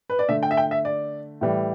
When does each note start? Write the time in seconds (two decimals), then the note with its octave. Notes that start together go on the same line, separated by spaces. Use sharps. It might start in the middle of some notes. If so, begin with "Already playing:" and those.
0.10 B4
0.19 D5
0.29 D3 A3 E5
0.43 G5
0.51 E5
0.57 G5
0.71 E5
0.85 D5
1.41 A2 E3 G3